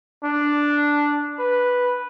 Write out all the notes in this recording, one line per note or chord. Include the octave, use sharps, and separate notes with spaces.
D4
B4